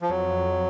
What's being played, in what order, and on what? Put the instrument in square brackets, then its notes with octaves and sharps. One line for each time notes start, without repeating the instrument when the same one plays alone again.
[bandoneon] F3
[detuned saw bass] F2 [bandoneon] F#3